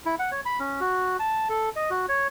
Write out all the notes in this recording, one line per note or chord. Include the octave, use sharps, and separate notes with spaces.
E4
F#5
C#5
B5
C#4
F#4
A5
A4
D#5
F#4
C#5